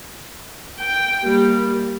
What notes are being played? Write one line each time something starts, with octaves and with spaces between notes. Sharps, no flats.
G5
G3 A#3